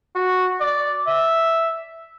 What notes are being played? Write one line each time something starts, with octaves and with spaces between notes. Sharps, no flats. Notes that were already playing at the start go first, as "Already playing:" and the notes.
F#4
D5
E5